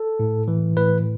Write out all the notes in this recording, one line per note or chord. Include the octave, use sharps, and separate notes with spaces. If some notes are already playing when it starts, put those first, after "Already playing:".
Already playing: A4
A2
E3
A2 B4